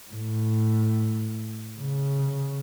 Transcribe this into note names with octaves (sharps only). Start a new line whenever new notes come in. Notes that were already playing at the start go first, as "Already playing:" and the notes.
A2
C#3